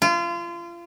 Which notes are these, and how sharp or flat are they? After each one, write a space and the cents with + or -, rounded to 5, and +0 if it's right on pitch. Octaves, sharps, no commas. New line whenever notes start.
F4 -30